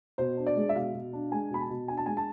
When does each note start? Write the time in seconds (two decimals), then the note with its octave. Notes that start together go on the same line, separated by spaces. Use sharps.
0.18 B2 C5
0.37 D4
0.47 D5
0.56 G#3
0.69 E5
0.75 B2 F5
0.94 B2
1.13 D4
1.32 G#3 G#5
1.50 B2 B5
1.61 A5
1.70 B2
1.88 D4 G#5
1.97 A5
2.06 G#3 G#5
2.17 A5